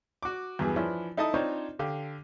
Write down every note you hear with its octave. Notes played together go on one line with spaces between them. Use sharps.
F#4 D6
E2 G2 E3 F#3 G#4
E3 F3 D4 E4 C#5
D#4 E4 A4 D#5 A5 D#6
C4 D4 D#4 F4 C5 C#5
D3 G4 F5